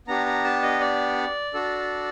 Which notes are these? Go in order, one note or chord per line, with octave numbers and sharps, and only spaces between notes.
B3 D4 G4 A#5
A#5
A5
D#5
D5
D4 F#4 A4